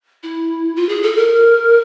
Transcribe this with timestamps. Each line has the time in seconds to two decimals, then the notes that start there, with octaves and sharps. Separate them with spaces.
0.23 E4
0.76 F4
0.89 G#4
1.02 A4
1.16 A#4